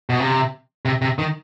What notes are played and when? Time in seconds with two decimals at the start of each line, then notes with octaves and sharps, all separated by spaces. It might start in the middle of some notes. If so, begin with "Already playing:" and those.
0.10 B2
0.20 C3
0.85 C3
1.02 C3
1.19 D#3